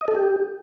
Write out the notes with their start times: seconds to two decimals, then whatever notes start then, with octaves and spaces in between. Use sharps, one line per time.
0.01 D#5
0.08 A4
0.15 G4